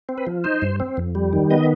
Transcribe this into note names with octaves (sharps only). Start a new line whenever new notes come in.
C4
B4
F3
D#4 C5
G2
C4
F2
G3
D#3
B3 D#5